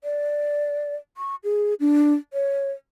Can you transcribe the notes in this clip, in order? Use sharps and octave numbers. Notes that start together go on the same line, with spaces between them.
D5
C#6
G#4
D4
C#5